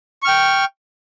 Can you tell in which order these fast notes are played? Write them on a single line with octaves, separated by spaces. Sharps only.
C#6 F6 G5